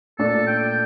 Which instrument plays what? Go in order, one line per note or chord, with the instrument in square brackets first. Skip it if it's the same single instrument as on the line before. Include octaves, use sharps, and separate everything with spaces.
[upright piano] A#2 A3 D4 [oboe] A4
[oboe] G5